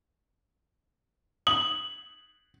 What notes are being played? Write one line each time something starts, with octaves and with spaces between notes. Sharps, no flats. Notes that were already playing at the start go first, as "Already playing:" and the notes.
D#6 F#7